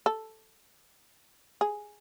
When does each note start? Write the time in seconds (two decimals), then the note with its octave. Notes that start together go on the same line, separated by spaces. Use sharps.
0.06 A4
1.61 G#4